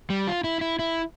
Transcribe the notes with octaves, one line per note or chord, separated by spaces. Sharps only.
G3
F4
E4
E4
E4